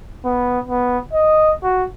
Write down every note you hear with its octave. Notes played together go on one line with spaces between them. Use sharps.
B3
B3
D#5
F#4